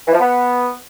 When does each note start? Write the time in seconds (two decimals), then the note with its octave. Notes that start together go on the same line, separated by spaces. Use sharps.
0.06 E3
0.13 F3
0.19 B3